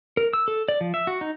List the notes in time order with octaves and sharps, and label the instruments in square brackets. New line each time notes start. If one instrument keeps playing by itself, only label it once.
[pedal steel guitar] A#4
E6
A4
D5
F3
E5
F#4
D#4